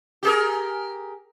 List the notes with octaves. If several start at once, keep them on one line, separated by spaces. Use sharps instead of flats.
G4 G#4 A#4